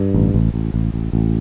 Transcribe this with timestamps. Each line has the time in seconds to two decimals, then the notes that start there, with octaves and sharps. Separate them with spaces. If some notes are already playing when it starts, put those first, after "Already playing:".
Already playing: G2
0.14 A1
0.34 A1
0.54 A1
0.74 A1
0.94 A1
1.13 A1